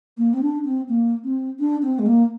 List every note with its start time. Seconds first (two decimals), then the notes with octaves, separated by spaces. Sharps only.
0.18 A#3
0.33 C4
0.42 D4
0.65 C4
0.89 A#3
1.24 C4
1.59 D4
1.82 C4
1.99 G#3
2.06 A#3